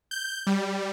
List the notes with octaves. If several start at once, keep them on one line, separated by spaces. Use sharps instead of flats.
G6
G3